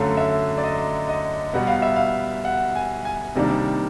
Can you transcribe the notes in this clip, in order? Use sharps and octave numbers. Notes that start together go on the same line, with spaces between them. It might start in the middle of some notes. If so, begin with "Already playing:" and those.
Already playing: F#2 D3 F#3 A3 F5
E5
D5
D#5
D#5
B2 G3 B3 F#5
F5
E5
F5
F#5
G#5
G#5
C3 D#3 G3 A#3 D4